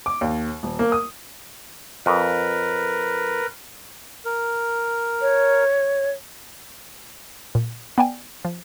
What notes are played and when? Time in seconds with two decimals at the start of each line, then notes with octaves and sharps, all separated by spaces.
0.06 D6
0.21 D#2
0.63 D#1
0.79 A#3
0.92 D#6
2.06 F2 A#4 B4
4.25 A#4
5.22 C#5
7.55 A#2
7.98 B3 D5 G5 G#5
8.45 F3